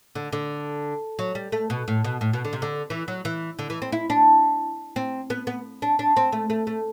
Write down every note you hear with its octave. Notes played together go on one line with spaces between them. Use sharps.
D3
D3
F#3
G3
A3
B2
A2
B2
A2
B2
D3
C3
D3
E3
F#3
E3
D3
E3
C4
E4
D4
C4
B3
B3
D4
D4
C4
A3
A3
A3